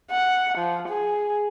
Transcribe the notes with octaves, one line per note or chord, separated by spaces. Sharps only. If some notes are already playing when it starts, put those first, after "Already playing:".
F#5
F3
G#4